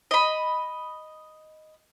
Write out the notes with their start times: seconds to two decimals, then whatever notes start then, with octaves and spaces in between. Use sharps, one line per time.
0.11 D#5 B5